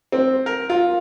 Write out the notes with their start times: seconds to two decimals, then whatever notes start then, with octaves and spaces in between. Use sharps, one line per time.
0.12 C4
0.46 A#4
0.70 F4